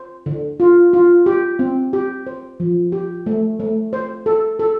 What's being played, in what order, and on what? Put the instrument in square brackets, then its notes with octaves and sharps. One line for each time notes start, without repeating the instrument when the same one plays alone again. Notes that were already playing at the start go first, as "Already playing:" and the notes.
Already playing: [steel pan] C5
D3
F4
F4
G4
C4
G4
C5
F3
G4
A3
A3
C5
A4
A4